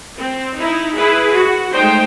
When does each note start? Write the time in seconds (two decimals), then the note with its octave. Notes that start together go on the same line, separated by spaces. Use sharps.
0.19 C4
0.57 D#4 E4
0.94 E4 G#4 B4
1.35 F#4
1.74 G#3 A3 D#4 C5 G5